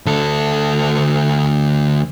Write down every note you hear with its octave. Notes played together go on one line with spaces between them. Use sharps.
D2 A4